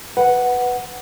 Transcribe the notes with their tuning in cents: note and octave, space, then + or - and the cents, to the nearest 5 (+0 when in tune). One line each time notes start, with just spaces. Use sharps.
B4 +0 F#5 +0